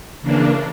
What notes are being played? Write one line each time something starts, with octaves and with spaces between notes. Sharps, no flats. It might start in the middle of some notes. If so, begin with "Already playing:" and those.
C#3 E3 A#3 D4